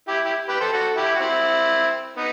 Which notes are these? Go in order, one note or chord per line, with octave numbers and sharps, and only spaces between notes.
E4 G4
E4 G4
G4 B4
A4 C5
F#4 A4
E4 G4
F#4
C4 E4
B3 D#4